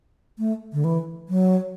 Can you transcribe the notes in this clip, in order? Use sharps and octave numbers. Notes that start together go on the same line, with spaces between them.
A3
D3
E3
F#3